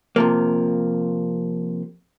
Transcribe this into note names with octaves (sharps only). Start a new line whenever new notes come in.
C3 F3 A#3